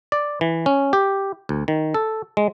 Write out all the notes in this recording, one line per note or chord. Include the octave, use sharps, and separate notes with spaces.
D5
E3
C#4
G4
D2
D#3
A4
G#3